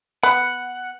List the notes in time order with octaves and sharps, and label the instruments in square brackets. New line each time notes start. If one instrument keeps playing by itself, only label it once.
[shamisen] B3 [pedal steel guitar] F#5